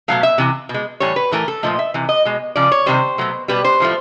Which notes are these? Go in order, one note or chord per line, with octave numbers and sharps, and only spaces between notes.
B2 F#3 A3 F5
E5
C3 E3
B2
G#3
A2 E3 G3 C#5
B4
A2 E3 A3 A#4
A4
A#2 F3 A3 D#5
E5
C3 E3
D#5
B2 G#3
C#3 F3 D5
C#5
C3 D#3 G3 C5
B2 F#3 A3
B2 G3 B4
C5
A2 F3 A3